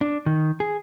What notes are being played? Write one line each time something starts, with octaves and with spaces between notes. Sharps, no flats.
D4
D#3
G#4